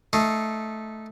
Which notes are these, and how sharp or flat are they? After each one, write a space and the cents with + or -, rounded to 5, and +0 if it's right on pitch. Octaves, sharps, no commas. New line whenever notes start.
A3 -10 D#4 +0 F5 -20